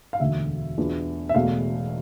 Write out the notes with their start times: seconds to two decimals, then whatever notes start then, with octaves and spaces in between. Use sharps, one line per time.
0.13 F5
0.20 E1 D2 D3 E5
0.78 E2 B2 B3 D4 F4
1.29 E5
1.35 E1 E2 B2 A3 F5